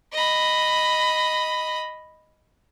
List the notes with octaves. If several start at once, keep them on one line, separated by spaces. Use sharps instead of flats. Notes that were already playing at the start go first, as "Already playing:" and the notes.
D#5 B5